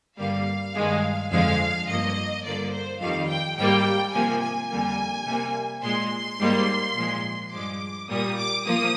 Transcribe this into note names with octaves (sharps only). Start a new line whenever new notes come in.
G2 D3 G3 A#3 F5
G2 D#3 G#3
F2 D3 F3 G#3 F5
G2 F3 A#3 D#5
G2 D3 F3 A#3 D5
C5
F2 D#3 G3 F5
G5
G#2 G3 A#3 G5
C3 F3 A#3 G#5
G#5
F2 D3 G3 A#3
C3 G3 A#3
A#2 G#3 C6
G#2 G3 A#3
A#2 F3 G#3
G2 F3 G#3 D6
A#2 G3 A#3 D#6
D6
F3 A#3 D#6